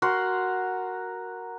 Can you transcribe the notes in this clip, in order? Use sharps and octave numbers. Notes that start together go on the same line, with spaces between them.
F#4 A#4 F#5 C6